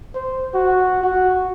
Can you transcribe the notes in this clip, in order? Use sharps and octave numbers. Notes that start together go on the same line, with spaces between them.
C5
F#4
F#4